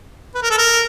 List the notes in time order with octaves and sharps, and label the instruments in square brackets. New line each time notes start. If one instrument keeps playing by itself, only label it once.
[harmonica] B4
A#4
A4
A#4